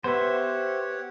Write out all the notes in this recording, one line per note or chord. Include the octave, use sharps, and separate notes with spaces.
B3 G4 C5 C#5 E5 F#5